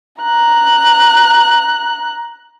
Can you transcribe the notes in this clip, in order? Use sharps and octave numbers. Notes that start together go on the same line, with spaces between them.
A#5 F#6